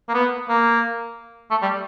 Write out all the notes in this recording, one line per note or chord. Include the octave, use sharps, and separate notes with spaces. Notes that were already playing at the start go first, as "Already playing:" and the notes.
A#3
B3
A#3
A3
G3